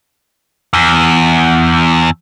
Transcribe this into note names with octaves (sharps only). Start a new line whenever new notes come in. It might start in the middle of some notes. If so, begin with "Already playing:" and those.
E2